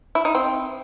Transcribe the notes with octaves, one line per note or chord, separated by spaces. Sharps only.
E4
D#4
C4